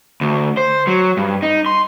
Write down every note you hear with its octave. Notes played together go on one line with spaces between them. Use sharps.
D2
C5
F#3
G2
D#4
C6